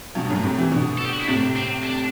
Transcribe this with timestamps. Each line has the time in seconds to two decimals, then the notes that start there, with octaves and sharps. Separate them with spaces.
0.15 G2 B2
0.29 F#2 A2
0.44 A2 C3
0.58 C3 E3
0.71 B2 D3
0.98 A4
1.05 G4
1.13 F#4
1.20 E4
1.28 A2 C3 D4
1.56 C4
1.84 D4